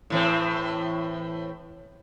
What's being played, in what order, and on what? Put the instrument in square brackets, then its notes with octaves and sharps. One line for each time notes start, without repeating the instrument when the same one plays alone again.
[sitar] A2 E3 C4